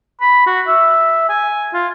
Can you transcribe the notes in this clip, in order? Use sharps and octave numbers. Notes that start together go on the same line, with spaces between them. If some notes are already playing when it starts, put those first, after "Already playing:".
B5
F#4
E5
G#5
F4